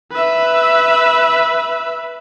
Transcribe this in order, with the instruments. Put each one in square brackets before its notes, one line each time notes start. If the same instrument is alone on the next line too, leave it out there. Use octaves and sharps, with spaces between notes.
[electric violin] B4 E5